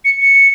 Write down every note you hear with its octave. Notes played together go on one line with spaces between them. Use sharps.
C#7
C#7